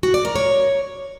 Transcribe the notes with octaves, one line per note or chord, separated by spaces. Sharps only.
F#4
D5
A#4
C#5